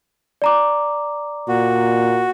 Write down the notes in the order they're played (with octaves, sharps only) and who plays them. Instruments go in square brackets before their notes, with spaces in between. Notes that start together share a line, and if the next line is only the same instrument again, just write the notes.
[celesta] D5 A#5 D6
[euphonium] A#2 [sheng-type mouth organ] F#4